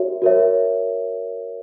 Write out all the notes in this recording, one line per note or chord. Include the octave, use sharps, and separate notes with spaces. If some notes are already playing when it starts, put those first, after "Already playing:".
Already playing: F#4 A#4 C#5 E5
F#4 A#4 C#5 E5